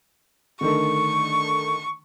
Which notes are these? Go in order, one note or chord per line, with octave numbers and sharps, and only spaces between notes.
D3 D#3 A3 C#6